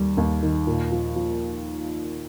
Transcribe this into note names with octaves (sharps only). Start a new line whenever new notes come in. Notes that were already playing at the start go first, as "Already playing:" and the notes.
Already playing: D#2 G3
D#2
D#3
A#2
F3
F3